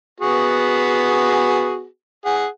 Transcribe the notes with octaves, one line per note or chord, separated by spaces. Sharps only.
B3 F#4 G#4
G#4 F#5